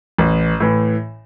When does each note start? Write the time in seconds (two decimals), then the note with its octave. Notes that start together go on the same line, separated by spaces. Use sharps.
0.19 A1
0.60 A2 E3